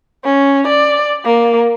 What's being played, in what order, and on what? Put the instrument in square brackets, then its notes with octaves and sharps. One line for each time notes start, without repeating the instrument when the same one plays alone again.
[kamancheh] C#4
D5
A#3